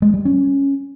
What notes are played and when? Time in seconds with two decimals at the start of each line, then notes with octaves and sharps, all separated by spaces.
0.02 G#3
0.14 G3
0.25 C#4